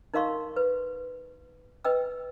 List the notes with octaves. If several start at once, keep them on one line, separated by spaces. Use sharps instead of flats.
D#4 A#4 D#5 F5 C6 C#6
B4
B4 D#5 G5 E6